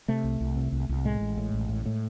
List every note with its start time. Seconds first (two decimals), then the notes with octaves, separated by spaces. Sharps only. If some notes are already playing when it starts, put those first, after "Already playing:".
0.08 C3 A3
0.24 C2
0.40 C2
0.56 C3
0.72 C2
0.89 C2
1.05 A2 G#3
1.21 A1
1.38 A2
1.53 A1
1.69 A2
1.86 A2